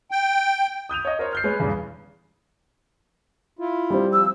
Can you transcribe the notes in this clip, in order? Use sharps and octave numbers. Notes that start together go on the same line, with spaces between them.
G5
D#6 G6 D#7 F7
C#5 D#5
A#4 C5 C#5
F6 G6 C7
G#3 B4 C#5
E2 G2 C#3
E4 F4
G3 C4
F3 E6